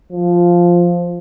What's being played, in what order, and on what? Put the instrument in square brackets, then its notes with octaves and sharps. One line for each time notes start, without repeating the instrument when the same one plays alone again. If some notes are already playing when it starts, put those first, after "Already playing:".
[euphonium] F3